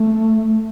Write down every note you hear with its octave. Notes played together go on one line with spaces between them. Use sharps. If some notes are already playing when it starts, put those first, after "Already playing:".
Already playing: A3